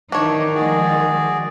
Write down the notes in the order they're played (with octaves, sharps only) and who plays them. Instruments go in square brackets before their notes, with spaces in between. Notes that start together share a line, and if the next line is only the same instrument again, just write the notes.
[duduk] D#3 [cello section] E3 D#4 [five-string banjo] D4 C#5
[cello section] F3 G#3 [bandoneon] F#4 G#4 D5